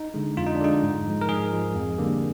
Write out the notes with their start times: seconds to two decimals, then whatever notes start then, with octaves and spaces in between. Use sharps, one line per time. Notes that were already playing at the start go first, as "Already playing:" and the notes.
Already playing: D#4
0.14 D3 G#3
0.37 F2 F4
0.47 D#4
0.55 D4
0.61 D3 G#3 D#4
0.83 G#2
1.06 F3 G#3
1.21 A#4
1.29 G#2 G#4
1.52 F3 G#3
1.75 F2
1.98 D3 G3 A#3